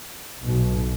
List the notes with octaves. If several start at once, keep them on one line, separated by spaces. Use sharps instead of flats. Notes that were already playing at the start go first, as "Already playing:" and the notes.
B1 B2